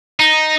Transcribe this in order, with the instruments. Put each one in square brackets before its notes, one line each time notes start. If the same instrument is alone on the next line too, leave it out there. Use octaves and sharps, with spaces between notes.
[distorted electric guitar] D#4